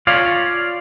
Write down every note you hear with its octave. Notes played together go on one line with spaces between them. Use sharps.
F4 C#5 D5 F5